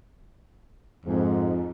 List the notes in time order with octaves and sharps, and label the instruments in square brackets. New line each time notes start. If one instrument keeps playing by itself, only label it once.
[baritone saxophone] F2 [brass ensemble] G#2